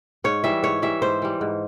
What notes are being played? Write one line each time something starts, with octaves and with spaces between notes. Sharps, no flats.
G#2 C#5
E3 G3 E5
G#2 C#5
E3 G3 E5
G#2 C5
E3 G3
G#2